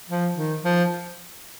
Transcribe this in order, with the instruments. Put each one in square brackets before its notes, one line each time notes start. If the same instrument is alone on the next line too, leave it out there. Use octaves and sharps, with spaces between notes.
[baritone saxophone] F3
D#3
F3